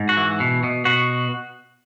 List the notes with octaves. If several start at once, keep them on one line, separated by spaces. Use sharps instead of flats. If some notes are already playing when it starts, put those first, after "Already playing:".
Already playing: G#2
F#4
E3
B2
B2
B2 F#4